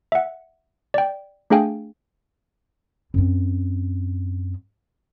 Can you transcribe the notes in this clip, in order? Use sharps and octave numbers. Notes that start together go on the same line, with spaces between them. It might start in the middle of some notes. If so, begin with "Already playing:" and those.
E5 F#5
D5 G5
A3 D4 G#4 F5 G5 G#5
F#2 C4